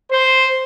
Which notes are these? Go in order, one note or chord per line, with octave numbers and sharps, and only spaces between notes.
C5